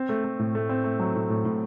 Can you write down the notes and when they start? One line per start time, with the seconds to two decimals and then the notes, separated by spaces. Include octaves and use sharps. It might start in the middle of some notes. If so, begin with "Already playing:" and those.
Already playing: C4
0.09 A3
0.24 A3
0.39 A2
0.55 A3
0.69 C4
0.84 A3
1.00 F#3
1.15 A2
1.30 A2
1.45 A2